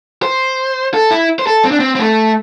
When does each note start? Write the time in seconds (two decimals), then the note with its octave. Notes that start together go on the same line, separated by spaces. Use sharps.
0.23 C5
0.94 A4
1.11 E4
1.39 C5
1.47 A4
1.64 C4
1.72 D4
1.80 C4
1.95 C4
1.99 A3